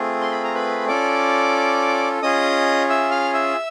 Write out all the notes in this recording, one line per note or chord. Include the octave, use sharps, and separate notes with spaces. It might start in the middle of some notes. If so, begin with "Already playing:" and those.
Already playing: A3 C4 F4 G#4
C6
B5
A#5
B4 B5
C#4 F4 A4 D5 D6
C#4 F4 G#4 D#5 D#6
E5 E6
F5 F6
E5 E6